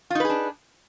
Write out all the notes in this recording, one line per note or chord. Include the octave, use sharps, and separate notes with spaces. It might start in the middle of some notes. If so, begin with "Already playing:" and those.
D4 D#4 F4 G#4 B4